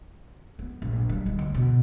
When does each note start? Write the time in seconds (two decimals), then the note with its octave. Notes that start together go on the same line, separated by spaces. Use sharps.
0.59 B3
0.82 A#1
1.09 G3
1.26 D#3
1.39 D2
1.54 B2